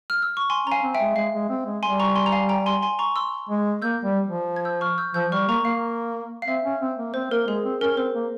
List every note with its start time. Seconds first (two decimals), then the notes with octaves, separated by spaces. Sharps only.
0.10 F6
0.22 E6
0.37 C#6
0.50 G#5 C6
0.67 C#4 A#5
0.72 F5 G#5
0.83 C4
0.95 E5 G5
1.00 G#3
1.16 G#3 F5
1.34 G#3
1.49 C4
1.66 G#3
1.83 G3 G#5 C6
2.00 A#5 C#6
2.16 G#5 C6
2.26 A#5
2.32 F5 G#5
2.49 G5 A#5
2.66 G#5 C6
2.82 G#5 C6
2.99 A#5 C#6
3.16 C6 E6
3.49 G#3
3.82 A#3 E6 G6
4.04 G3
4.27 F3
4.56 G#6
4.65 E6 G6
4.81 C#6 F6
4.98 E6 G6
5.14 F3 E6 G6
5.32 G3 C#6 F6
5.48 A#3 A#5 C#6
5.65 A#3 F5
6.42 F5
6.48 C4 E5
6.64 C#4
6.81 C4
6.98 A#3
7.14 C4 C5
7.31 A#3 A#4
7.47 G#3 G#4
7.64 C4
7.81 C#4 A#4
7.97 C4 C5
8.15 A#3